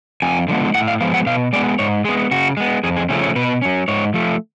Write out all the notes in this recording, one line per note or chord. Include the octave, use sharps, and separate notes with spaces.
F2 G#5
D3 F3 G#3 B3
A2 F#5
F5
F3 G#3 B3 F5
F#5
B2 F5
G#3 B3 D5
G#2 C#5
G#3 B3 G#4
C#3 F#4
G#3 B3
F2 G#4
G#4
C#3 F3 A3 C#4
C#5
B2 B4
F#3 C#4
G#2 C#5
F3 A3